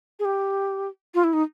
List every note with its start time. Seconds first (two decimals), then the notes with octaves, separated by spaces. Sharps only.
0.19 G#4
0.25 G4
1.14 F4
1.24 E4
1.33 D#4